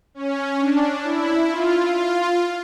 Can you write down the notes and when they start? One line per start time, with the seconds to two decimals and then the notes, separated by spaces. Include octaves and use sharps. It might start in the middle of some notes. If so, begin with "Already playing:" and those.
0.14 C#4
0.59 D4
1.04 E4
1.49 F4
1.93 F4